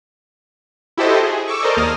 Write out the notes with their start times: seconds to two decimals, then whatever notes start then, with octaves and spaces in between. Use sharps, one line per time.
0.98 E4 F#4 G4 A4 C5 D#5
1.24 G#4
1.48 C#6 D6 E6
1.63 A4 A#4 C5 D5 D#5
1.77 D#2 A#3 D#6 F6